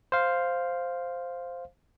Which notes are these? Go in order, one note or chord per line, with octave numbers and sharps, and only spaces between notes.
C5 F5